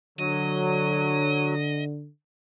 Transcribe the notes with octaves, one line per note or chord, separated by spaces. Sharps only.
D3 F#3 D#5